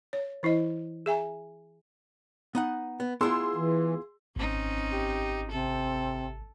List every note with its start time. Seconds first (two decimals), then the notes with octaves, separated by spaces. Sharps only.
0.13 C#5
0.43 E3 E4 C5 D#5
1.06 G#4 E5 G#5 A#5
2.55 B3 D#4 F#5
3.00 B3
3.21 B3 E4 F4 G#4 C6 E6
3.56 E3
4.36 G#1 C4 C#4 D#4
4.92 G4
5.51 C3 C4 A4